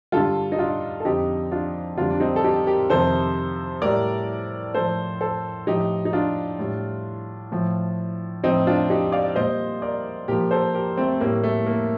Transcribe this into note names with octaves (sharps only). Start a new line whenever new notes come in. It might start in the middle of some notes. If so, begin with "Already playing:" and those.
G2 D3 G3 F4 A4
D#4
D4 F4
A4
F2 D3 F3 D#4 G4
D4 F4
F2 D3 G3 D4 F4
D4
C4 D#4
A4
D#4 G4
G4 A#4
F2 C3 D#3 A4 C5
A2 G3 A#4 D5
A2 F3 A4 C5
A4 C5
A2 F3 D#4 G4
D#4
D4 F4
A2 G3
A2 F3
A2 F3 C4 D#4
D4 F4
D#4 G4
D5 F5
A#2 G3 C5 D#5
A#4 D5
A#2 F3 G4 A#4
A4 C5
G4 A#4
A3 C4
A2 G3 A#3
A3
A#3